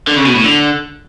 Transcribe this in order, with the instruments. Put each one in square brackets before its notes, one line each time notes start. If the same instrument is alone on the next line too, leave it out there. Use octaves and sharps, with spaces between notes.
[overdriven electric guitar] D3
C#3
B2
A2
D3